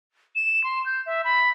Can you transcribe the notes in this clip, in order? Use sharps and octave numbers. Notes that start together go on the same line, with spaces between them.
E7
C6
G6
E5
B5